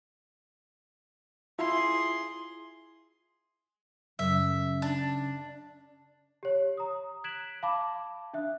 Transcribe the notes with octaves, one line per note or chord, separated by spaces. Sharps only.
E4 F4 G#4 C6
F#2 C#3 E5
D4
G4 C#5
A#5 D#6
F#6 G#6 B6 D7 E7 F#7
F5 A5 B5 D6
D4 E5 F#6